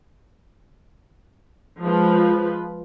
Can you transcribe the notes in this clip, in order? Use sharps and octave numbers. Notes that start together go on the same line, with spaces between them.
F3 G#3 B4